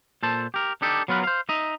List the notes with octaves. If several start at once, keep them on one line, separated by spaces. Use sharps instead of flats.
A#2 A4 C5 A5
G4 A#4
D4 D#4 G4 A4
F#3 B3 F4 A#4 B4
C5 F5
D#4 D#5 E5